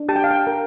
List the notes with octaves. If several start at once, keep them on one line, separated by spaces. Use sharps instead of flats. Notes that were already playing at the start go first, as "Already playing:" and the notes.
Already playing: D4
G4 A5
G5
F5
G5
A#4